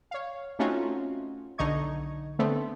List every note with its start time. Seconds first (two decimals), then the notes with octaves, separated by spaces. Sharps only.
0.11 C#5 F5
0.59 A3 C4 C#4 D#4 F4 F#4
1.58 B1 D3 D#4 D#5 C#6 G#6
2.39 D3 A3 B3 C4